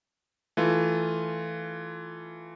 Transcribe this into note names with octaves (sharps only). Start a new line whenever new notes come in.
E3 A3 F4